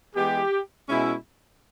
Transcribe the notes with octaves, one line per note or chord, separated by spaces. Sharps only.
E3 G#3 B3 G4
B2 G#3 C#4 E4